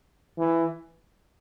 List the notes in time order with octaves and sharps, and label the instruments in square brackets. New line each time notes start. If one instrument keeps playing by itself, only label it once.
[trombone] E3